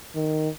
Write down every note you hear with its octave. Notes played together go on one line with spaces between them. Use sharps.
D#3